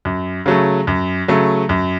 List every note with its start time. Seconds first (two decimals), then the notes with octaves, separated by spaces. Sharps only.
0.05 F#2
0.46 C#3 F#3 A3
0.87 F#2
1.28 C#3 F#3 A3
1.69 F#2